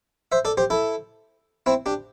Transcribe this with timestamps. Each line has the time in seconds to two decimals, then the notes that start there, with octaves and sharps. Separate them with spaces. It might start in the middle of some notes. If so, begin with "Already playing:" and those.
0.32 C5 E5
0.45 A4 D5
0.57 G4 C5
0.70 E4 A4
1.66 C4 E4
1.86 D4 G4